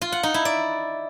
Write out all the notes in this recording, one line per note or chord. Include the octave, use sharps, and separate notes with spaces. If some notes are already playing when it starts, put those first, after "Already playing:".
F4
F#5
D#4
E4
D5